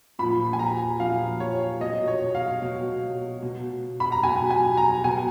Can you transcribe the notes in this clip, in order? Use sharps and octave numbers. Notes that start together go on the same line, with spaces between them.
A#2 F3 B5
G#5
A#5
A#2 F3 F5
C#5
B2 D#5
C#5
F5
B2
B2
B5
A#5
B2 G#5
G#5
A#5
B2 G#5